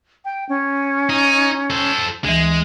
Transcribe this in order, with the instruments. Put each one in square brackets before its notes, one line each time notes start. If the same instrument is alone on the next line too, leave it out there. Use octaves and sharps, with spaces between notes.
[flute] G5
C#4
[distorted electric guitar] D#4
A4 C5
[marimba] D2 E3 [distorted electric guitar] G#3